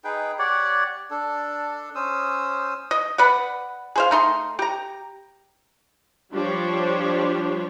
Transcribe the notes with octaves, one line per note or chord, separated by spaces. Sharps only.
D#4 G#4 B4 G5
G4 C#5 D5 F#5
D4 A4
C#4 C5 D#6 E6
D#5
B4 D5 F#5
G#4 C5 F5
A3 D#4 C6
G4 A#5
F3 G3 D4 G4 C5 C#5